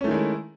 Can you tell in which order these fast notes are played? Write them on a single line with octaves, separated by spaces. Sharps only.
C#4 A3 D#3 G#3 E4